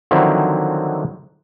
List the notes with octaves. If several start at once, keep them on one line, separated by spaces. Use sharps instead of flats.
D3 D#3 F3 F#3 C4 E4